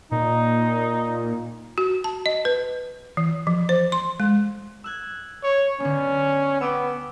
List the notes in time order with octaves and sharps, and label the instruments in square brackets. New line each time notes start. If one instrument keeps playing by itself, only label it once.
[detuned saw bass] A#2 [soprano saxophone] D#4
[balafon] F#4
A5
D#5
B4
E3
F3
C5
C6
G#3
[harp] E6 F#6 G#6
[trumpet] C#5
[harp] D3 B3 [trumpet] C#4
[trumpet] B3 [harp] G5 D6 E6